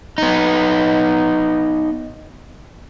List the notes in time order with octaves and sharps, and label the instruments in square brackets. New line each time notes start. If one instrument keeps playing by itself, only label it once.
[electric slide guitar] B3 D#4